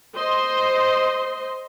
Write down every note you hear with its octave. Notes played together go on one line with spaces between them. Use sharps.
C5 D#5 C6